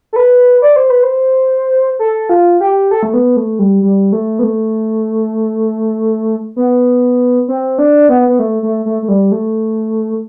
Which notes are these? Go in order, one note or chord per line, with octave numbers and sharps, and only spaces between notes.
A4
B4
D5
C5
B4
C5
A4
F4
G4
A4
A3
B3
A3
G3
G3
A3
B3
A3
B3
C4
D4
B3
B3
A3
A3
A3
A3
G3
A3